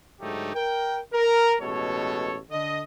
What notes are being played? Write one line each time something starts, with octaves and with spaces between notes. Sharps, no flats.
G#2 D3 F#3 A3 D#4 G4
A#4 G5
A#4
A1 B2 G#3 A4 C#5
D3 D#5